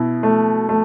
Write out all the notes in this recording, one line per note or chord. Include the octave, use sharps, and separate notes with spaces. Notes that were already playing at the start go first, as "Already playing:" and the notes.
Already playing: B2 E4
A3
A3